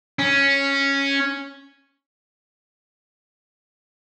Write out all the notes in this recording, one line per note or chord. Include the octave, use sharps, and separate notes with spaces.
C#4